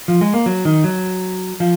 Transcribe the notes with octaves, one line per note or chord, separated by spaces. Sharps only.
F3
G#3
A#3
F#3
D#3
F#3
F3